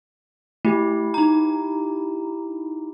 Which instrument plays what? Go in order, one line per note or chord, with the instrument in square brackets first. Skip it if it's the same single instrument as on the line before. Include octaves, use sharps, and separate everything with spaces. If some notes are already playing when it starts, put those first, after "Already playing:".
[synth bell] A3 [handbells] E4 G4
[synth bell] D#4 A#5